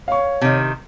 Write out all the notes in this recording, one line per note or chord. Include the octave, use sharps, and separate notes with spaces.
C#5 F5 C#6
C3 D#3